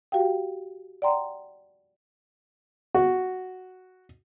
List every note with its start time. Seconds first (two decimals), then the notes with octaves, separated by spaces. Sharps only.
0.12 F#4 G4 F5 G5
1.02 D5 F#5 G5 A#5 C6
2.95 F#4